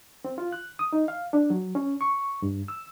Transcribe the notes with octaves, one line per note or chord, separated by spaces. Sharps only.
C4
F4
F#6
D#6
D#4
F5
D4
F#3
C#4
C#6
G2
E6